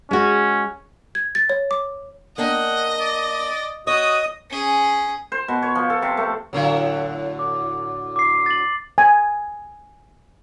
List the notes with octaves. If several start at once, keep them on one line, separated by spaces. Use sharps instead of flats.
G#3 C#4 F#4
G#6
A6
C#5
D6
A#3 D4 D#5 F#5 G5
D5
F#4 C#5 D#5 D#6
C#4 G#4
C5
B2
C#5
F3
A4
C3
A3
A2 D3 F#3
D6
D6 C7
A6 F#7
G#5